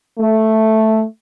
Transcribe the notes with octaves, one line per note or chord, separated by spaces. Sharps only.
A3